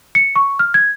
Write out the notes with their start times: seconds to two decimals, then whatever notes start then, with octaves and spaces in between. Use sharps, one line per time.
0.15 C#7
0.36 C#6
0.59 F6
0.74 G#6